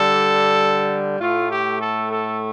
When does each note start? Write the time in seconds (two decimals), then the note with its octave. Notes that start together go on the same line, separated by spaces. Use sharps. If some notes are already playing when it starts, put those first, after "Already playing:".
Already playing: D3 G3 A4
1.20 A2 A3 F4
1.51 G4
1.81 A4
2.12 A4